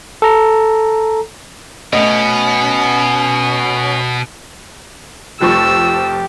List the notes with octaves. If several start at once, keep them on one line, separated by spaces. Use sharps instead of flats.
A4 A#5
B2 A3 B3 C#4 D#5
F1 F3 G4 C#6 E6